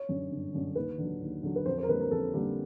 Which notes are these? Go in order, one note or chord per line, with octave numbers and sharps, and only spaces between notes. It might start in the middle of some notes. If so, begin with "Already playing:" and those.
Already playing: C#5
F#2 D3
G1
F#2 D3
D#2 B4
D3 F#3
D#2
D3 F#3
B4
F2 C5
C5
A#4
D3 G3 A#3 B4
A#4
F2 A4
D3 G3 A#3